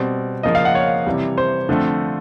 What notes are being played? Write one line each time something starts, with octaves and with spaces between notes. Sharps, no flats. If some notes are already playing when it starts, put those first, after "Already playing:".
Already playing: B2 G3 C4
C#3 F3 A#3 D#5
F5
F#5
C#5
C3 E3 G3
C5
D3 F3 A3 C4